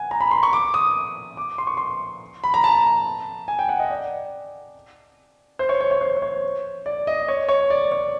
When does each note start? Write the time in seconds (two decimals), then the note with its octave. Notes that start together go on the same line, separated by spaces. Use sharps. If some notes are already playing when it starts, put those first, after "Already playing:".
Already playing: F#5 G#5
0.11 A#5
0.21 B5
0.31 C6
0.43 C#6
0.53 D6
0.74 D#6
1.37 D6
1.58 C6
1.67 C#6
1.77 C6
2.44 B5
2.54 A#5
2.64 A5
3.48 G#5
3.59 G5
3.69 F#5
3.79 D#5
3.91 D5
5.59 C5
5.69 C#5
5.81 C#5
5.91 C#5
6.01 C5
6.17 C5
6.22 C#5
6.86 D5
7.07 D#5
7.28 C#5
7.49 C#5
7.70 D5
7.92 C#5